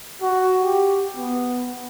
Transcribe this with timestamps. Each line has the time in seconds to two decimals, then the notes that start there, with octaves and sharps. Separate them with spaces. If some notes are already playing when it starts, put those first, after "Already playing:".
0.22 F#4
0.62 G4
1.17 B3